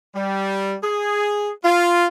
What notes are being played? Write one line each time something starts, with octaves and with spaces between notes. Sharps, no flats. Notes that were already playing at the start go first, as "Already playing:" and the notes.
G3
G#4
F4